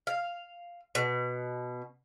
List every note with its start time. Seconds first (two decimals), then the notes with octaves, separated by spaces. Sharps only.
0.07 F5
0.95 B2